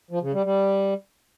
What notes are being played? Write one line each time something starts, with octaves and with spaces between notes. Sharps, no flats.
F3
C#3
G3
G3